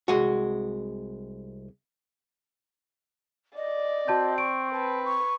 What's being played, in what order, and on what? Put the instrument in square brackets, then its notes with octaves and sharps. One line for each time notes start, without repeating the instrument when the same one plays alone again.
[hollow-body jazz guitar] C2 G#3 F#4
[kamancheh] D5 [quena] D#5
[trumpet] C4 [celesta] F#4 A5 G6
[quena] C#6 [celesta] D7
[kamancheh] B4 [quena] A5
[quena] C#6